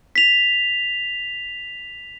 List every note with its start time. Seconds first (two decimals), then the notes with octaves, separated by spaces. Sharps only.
0.16 B6 F7